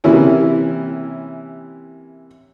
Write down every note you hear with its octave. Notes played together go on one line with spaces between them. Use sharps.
C3 E3 A#3 C#4 E4